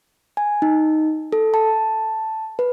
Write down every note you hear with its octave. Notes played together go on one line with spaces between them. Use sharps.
G#5
D#4
A4
A5
B4